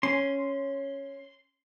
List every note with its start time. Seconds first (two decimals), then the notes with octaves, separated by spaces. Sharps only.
0.03 C#4 C6